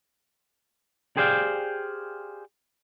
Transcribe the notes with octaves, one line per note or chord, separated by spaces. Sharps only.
G4 G#4 C5 D5 F5 G5